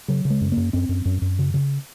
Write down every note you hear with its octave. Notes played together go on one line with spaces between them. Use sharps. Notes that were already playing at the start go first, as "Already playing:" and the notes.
C#3 F#3
C#3
G#3
F#2
A#3
F#2
F#2 C4
F#2
F#2
F#2
C#3
C#3